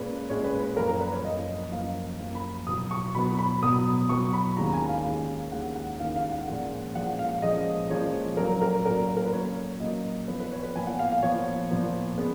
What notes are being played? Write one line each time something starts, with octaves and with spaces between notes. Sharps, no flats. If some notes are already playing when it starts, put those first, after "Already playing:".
Already playing: A#2 G#3 C#4 B4
A#2 G#3 C#4 C#5
B4
B4
F#2 F3 A#3 A#4
A#4
B4
C#5
F#2 F3 A#3 D#5
F#2 F3 A#3 F5
F#2 F3 A#3
B5
B2 F#3 B3 D#6
C#6
B2 F#3 B3 B5
B5
B2 F#3 B3 D#6
B2 F#3 B3 C#6
B5
D#2 D#3 G#3 C#4 A#5
G#5
F5
D#2 D#3 G#3 C#4
D#2 D#3 G#3 C#4 F#5
F#5
D#2 D#3 G#3 C#4 F5
F5
F#5
A#2 F3 G#3 C#4 F#5
A#2 F3 G#3 C#4 F#5
F5
A#2 F3 G#3 C#4 D#5
A#2 F3 G#3 C#4 C#5
A#2 F#3 A#3 C#4 A#4
A#4
A#2 F#3 A#3 C#4 A#4
A#4
B4
A#2 F#3 A#3 C#4 C#5
A#2 F#3 A#3 C#4 D#5
A#2 F3 B3 B4
B4
C#5
B4
A#2 F3 B3 G#5
F#5
F5
F5
A#2 F3 B3 C#5
A#2 F3 B3
C#3 G#3 B3